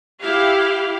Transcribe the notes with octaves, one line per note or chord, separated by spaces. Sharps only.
E4 G4 F5